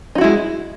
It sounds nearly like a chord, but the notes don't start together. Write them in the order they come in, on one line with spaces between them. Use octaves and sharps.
D#4 F#4 E4 G#3